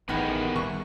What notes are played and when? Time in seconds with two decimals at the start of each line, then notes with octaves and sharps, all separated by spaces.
0.09 A1 D#3 B3 E4 G#4 A#4 B4 F#5
0.56 D#3 G3 C#6